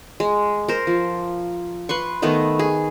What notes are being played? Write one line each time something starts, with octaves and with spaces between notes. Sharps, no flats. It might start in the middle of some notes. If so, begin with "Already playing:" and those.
G#3
A#4 C5
F3
B4 C6 C#6
D#3 A3 B3 D#5
G#4